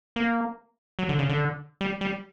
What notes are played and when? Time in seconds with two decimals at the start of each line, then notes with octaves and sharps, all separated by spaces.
0.16 A#3
0.99 F#3
1.09 D3
1.19 C#3
1.29 D3
1.81 G3
2.01 G3